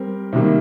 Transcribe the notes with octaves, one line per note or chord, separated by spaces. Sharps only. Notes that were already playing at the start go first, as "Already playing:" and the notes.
Already playing: G3 C4 G4 A#4
C3 D#3 G3 A#3